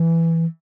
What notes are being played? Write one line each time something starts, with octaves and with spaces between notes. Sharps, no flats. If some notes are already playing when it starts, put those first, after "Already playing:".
Already playing: E3